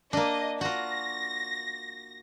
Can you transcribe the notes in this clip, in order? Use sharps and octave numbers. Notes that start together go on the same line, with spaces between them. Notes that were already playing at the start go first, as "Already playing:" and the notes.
A#3 D4 D#5
F4 F#4 A#6